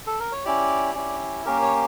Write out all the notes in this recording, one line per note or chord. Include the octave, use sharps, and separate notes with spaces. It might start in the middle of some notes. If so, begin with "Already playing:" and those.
A4
A#4
C#5
C#4 E4 G4 D5
C#4 E4 G4
A#3 C#4 G4 A#4
C#5